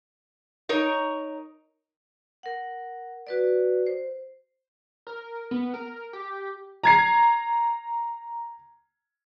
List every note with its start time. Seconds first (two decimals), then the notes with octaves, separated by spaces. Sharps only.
0.69 D#4 A#4 C#5
2.43 A#4 F#5
3.27 F#4 B4 D5
3.86 C5
5.07 A#4
5.51 B3
5.74 A#4
6.13 G4
6.83 A#5 G#6 C7